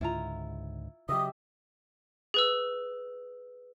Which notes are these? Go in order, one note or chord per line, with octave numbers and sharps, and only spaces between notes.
C#2 G#2 D3 E4 F4 A#5
C#3 F#3 G4 D#5 E5 D#6
G#4 B4 E6